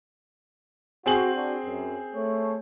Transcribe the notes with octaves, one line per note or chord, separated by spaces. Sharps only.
C4 F#4 G#4 F#7
D4 F#4
F#2
A3 C#5